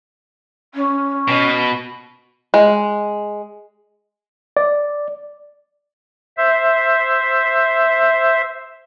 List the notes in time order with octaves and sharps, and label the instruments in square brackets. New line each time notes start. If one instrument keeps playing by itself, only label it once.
[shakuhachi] C#4
[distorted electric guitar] B2
[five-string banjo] G#3
[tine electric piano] D5
[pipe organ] C5 E5